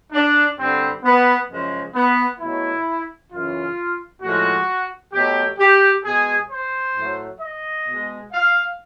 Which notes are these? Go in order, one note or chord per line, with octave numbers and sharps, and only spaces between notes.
D4
G2 D3 G3 C4
B3
F#2 C#3 F3 G#3
B3
B2 F#3 A3 E4
F#2 C#3 E3 F4
A2 F3 G#3 F#4
B2 F#3 A3 G4
G4
B2 G#3 G#4
C5
A2 F#3 A3
D#5
B2 G#3
F5